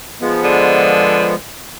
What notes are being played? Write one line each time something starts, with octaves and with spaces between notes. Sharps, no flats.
F3 G#3 B3
D3